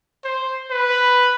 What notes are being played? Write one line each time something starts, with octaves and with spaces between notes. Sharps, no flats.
C5
B4